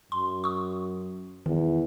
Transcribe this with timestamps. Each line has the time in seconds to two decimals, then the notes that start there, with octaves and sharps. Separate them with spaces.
0.12 F#2 C6
0.44 C#6 D#6
1.46 E2 D#3